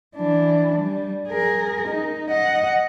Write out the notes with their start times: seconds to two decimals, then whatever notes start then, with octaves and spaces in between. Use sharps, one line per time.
0.16 E3 D4
0.81 G3
1.29 G#4 A#4
1.88 D#4
2.29 D#5 F#5